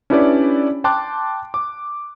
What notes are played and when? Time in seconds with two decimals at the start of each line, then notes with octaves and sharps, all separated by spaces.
0.10 C#4 D4 E4 G4 B4 D5
0.84 G5 A5 C6 D6 F#6
1.54 D6